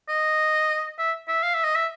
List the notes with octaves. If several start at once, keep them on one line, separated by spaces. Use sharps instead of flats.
D#5
E5
E5
F5
E5
D#5
E5